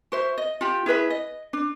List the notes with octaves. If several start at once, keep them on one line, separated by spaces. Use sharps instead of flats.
F#4 C5 E5
D#5
F4 G4
E4 G#4 B4 E5
D#5
D4